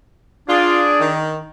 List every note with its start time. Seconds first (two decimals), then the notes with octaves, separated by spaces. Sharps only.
0.49 D4 F4 G#4 D5
1.00 D#3